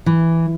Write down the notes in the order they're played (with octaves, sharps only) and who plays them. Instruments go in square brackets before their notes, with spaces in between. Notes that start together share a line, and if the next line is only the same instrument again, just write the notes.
[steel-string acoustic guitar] E3